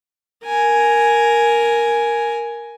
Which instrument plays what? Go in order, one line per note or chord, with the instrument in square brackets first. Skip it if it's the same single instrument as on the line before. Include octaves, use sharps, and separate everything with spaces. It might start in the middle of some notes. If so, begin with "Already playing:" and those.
[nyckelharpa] A#4 G#5